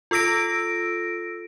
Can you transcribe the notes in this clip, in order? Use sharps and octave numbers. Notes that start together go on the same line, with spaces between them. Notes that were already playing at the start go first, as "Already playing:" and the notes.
F4 A4 E6 A#6 D7